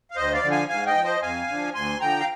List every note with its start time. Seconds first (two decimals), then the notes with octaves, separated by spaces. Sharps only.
0.11 F5
0.16 D2 C5 D#5
0.33 D5 F5
0.43 D3 F3
0.51 F5 G#5
0.68 G#2 F5 G#5
0.86 D#5 G5
0.95 F3
1.04 C5 D#5
1.22 F2 F5 G#5
1.48 D3 F3
1.74 D2 G#5 C6
2.00 D3 F3 G5 A#5
2.20 F5